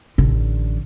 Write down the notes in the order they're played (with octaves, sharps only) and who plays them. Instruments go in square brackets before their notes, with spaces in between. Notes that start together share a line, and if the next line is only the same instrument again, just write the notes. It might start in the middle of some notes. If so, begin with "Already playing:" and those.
[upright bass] A1 D3